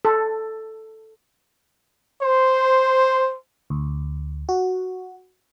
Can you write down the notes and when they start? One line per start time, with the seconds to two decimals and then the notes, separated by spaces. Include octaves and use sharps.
0.05 A4
2.22 C5
3.70 D2
4.49 F#4